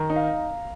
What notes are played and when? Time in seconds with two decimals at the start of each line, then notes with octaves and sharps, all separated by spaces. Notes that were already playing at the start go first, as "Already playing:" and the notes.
Already playing: D#3 A#5
0.10 D#4
0.16 F5